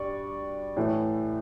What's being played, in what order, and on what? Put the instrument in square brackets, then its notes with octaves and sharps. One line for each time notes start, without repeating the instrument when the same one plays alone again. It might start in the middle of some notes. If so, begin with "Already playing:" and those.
Already playing: [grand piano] G2 G3 D5 C#6
A2 E3 A3